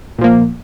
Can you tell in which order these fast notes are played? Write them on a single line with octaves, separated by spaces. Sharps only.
A#2 F3 A#3